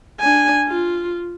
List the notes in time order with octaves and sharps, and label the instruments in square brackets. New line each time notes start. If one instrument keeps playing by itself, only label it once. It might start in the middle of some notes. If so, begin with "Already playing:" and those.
[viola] D4 G#5
F4